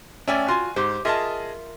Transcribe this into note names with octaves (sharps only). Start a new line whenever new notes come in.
A3 C#4 D5 E5 G5 G#5
F4 F#4 G#5 C6
G#2 G4 C5
F4 G#4 A#4 D#5 E5 A5